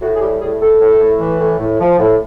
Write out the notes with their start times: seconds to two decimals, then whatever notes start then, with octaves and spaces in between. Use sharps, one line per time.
0.01 A2 F#4
0.15 G#4
0.20 G3 G4
0.41 A2 G#4
0.60 A2 A4
0.81 A2
1.00 A2
1.19 E3
1.40 A2
1.59 A2
1.79 F3
1.99 A2